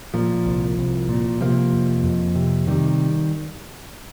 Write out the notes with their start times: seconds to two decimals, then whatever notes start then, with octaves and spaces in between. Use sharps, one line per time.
0.14 A#2 F3
0.46 C2
0.78 C2
1.09 A#2
1.41 C3 F3 A#3
1.73 F2
2.04 F2
2.35 C3
2.67 C3 D#3 G3